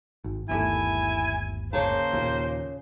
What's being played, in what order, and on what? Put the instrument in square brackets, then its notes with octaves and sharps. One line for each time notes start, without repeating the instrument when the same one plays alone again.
[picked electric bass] G#1
[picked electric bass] G1 D#2 A3 [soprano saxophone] E4 [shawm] G#5
[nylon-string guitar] C#3 C#5 A5 [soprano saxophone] A#3 [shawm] C5
[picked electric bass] D#2 A#2